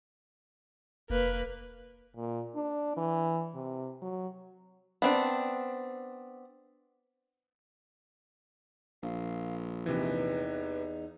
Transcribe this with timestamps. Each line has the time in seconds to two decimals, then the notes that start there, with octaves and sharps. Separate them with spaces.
1.10 F1 A#3 B4
2.16 A#2
2.55 D4
2.97 E3
3.55 C3
4.02 F#3
5.02 B3 C4 D4
9.03 A#1 F5
9.86 E2 C3 E3 D#4 B4